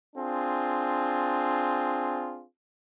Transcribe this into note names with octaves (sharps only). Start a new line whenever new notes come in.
C4 D4 F4 G#4